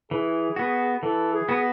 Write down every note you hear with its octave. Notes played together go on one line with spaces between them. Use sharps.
E3 G#4
B3 F#4
E3 A4
G#4
B3 F#4